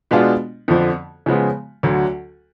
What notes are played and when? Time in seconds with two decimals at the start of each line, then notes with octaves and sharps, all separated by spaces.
0.11 B2 G#3 B3 D4 F4
0.68 F2 D3 F3
1.26 C#3 F3 G#3 B3
1.83 D2 D3 F#3